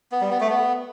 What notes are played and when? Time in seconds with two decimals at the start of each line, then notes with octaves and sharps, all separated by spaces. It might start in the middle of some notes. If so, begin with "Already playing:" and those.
0.12 B3
0.21 G3
0.31 B3
0.40 A3
0.50 B3